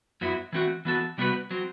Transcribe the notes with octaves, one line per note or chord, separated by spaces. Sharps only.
F#2 F#3 B3 E4
E3 A3 C4 F#4
E3 B3 F#4 A4
C3 G3 B3 F#4 B4
F#3 C4